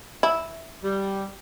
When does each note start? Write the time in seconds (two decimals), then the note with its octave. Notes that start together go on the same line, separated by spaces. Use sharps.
0.23 E4
0.83 G3